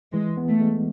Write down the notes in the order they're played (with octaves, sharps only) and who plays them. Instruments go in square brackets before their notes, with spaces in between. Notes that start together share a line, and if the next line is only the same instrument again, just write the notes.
[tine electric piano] E3 [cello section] G#3
[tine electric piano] B3
[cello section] A3
[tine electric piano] G#3